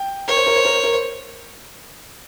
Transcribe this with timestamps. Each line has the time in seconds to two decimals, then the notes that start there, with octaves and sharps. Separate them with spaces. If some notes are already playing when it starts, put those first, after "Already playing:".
Already playing: G5
0.28 A#4 C#5
0.37 C5
0.46 A#4
0.56 C5
0.65 A#4
0.74 C5
0.83 A#4
0.93 C5